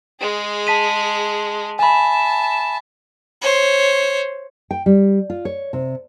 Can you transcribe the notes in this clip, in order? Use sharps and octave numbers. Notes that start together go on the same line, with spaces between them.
G#3 G#4
A5 B6 D#7
E5 G#5 A5 B5
C5 C#5
G5
G3
F4
C#5
C3